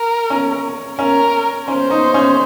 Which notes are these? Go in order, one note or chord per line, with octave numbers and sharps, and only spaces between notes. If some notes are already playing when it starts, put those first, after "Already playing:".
Already playing: A#4
C#4
C#4 A#4
C#4 C5
D#4
C#4